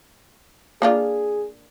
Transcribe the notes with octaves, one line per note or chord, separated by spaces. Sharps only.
A#3 D4 F4 G#4